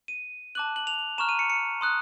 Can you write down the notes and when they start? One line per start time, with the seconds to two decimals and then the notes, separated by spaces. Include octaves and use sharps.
0.08 D#7
0.55 A5 D6 F#6 F#7
0.76 F#7
0.87 F7
1.18 A#5 C#6 F6 E7
1.29 D#7
1.39 C#7
1.50 C#7
1.81 C6 D#6 F#6